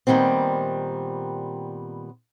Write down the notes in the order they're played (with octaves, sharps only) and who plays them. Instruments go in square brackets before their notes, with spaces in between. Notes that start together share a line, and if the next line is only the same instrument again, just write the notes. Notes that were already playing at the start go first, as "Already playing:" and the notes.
[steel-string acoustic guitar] A#2 D#3 G3 B3 C4